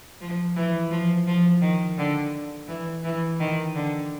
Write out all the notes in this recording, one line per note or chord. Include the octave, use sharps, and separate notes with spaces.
F3
E3
F3
F3
D#3
D3
E3
E3
D#3
D3